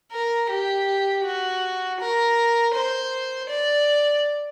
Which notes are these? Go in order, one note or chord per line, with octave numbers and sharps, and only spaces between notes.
A#4
G4
F#4
A#4
C5
D5